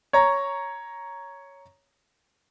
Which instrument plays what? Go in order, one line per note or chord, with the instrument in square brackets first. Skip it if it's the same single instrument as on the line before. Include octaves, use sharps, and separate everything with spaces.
[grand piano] C#5 A#5